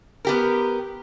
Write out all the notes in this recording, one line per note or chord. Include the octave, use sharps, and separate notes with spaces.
B3 G4 A#4